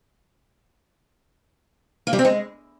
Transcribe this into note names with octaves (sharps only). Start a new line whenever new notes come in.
A#3
G3
C4
G#3